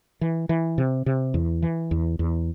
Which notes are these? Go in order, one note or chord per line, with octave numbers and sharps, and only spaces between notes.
E3
E3
C3
C3
E2
E3
E2
E2